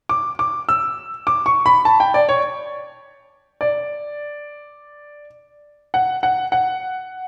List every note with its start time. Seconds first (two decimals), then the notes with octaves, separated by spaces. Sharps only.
0.09 D6
0.39 D6
0.69 E6
1.27 D6
1.46 C#6
1.66 B5
1.85 A5
2.00 G5
2.14 D5
2.29 C#5
3.61 D5
5.94 F#5
6.23 F#5
6.52 F#5